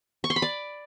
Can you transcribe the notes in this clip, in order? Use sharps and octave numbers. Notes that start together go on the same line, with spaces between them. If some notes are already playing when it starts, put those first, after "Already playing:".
C#6
C6
B5
D5